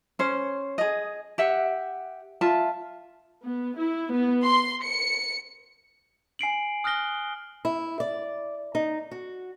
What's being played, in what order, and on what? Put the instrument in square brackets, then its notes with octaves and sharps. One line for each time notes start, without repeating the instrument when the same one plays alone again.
[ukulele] C#4 C5
G#4 D#5
G4 E5 F#5
F4 E5 A5
[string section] B3
E4
B3
C6
C#7
[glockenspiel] G#5 C7 D7 F#7
D#6 F6 F#6 A#6 G7
[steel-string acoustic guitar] E4
D5
D#4
F#4